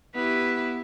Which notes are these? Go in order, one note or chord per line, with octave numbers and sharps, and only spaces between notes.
B3 E4 G4 B4